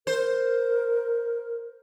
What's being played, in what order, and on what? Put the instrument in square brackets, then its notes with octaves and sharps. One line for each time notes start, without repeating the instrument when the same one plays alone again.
[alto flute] A#4 [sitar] C5